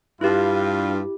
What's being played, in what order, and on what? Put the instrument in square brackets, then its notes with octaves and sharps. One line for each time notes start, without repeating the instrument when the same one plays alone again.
[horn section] G2 F4 [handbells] E4 G4